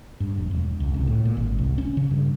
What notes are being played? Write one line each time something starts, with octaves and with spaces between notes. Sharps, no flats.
G2
F1
E1
C#2
C2
A2
A#2
G#1
C2
C#4
C#3
G2